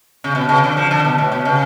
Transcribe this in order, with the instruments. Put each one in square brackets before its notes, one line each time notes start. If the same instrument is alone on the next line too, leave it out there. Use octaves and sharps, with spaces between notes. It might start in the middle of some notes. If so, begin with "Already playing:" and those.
[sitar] C#3
B2
C#3
D3
F3
D3
B2
A2
B2
C#3